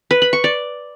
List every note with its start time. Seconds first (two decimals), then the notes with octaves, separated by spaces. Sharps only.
0.11 B4
0.22 B5
0.33 C#6
0.44 D5